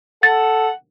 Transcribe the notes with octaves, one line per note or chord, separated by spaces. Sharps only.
A4 F#5 A6